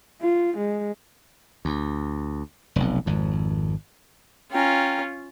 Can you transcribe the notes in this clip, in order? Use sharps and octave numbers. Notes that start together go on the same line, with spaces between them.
F4
G#3
D2
F1 B1
G#1 F2
C#4 F4 G5 G#5 A#5